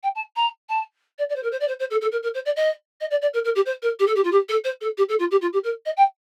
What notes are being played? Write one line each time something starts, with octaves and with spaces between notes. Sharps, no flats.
G5
A5
A#5
A5
D5
D5
C5
A#4
C5
D5
C5
C5
A4
A4
A#4
A#4
C5
D5
D#5
D#5
D5
D5
A#4
A#4
G4
C5
A#4
G4
A4
G4
F4
G4
A4
C5
A4
G4
A4
F4
G4
F4
G4
A#4
D#5
G5